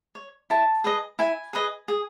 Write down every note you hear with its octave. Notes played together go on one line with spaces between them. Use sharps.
C#5
E4 A5
G#4 B4 D#5
E4 G#5
G#4 B4 D#5
G#4